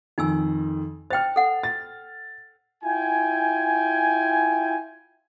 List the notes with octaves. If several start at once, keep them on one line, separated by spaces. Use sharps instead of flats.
F2 D#3 D#4 G#5 E6
C5 G5 F6 A6
A4 F#5
A6
E4 F4 G5 G#5